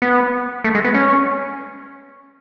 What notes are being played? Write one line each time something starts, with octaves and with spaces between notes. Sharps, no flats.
B3
A3
G#3
B3
C#4